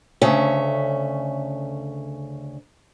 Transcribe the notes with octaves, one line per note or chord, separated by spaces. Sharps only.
D2 C#3 C#4 E5